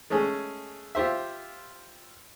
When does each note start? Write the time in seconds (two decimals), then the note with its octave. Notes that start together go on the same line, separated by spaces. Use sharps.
0.10 G#3 A3 C#4 G#4
0.95 F4 G4 C5 E5